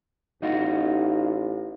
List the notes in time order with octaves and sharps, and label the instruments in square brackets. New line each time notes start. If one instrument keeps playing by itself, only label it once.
[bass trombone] A1 [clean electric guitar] D#4 F4 F#4